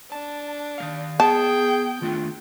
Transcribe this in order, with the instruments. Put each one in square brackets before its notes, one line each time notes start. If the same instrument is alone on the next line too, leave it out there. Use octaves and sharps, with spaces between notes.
[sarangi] D4 [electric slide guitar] A5
[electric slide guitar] D#3 G#3 F5
[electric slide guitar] B3 [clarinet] G#4 [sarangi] G5 [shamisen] A5
[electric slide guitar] D#3 A3 D4 [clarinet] F4